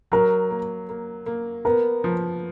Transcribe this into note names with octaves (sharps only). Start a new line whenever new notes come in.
F#3 A#4
A#3
A#3
A#3
B3 A#4
F3